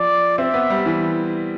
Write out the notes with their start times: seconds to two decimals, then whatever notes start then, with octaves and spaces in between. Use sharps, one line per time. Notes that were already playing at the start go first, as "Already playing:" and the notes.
Already playing: F3 D5
0.38 C4 E5
0.54 B3
0.70 G3
0.86 E3